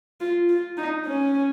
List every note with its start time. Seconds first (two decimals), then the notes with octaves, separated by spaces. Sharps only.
0.21 F4
0.49 F4
0.78 D#4
1.06 C#4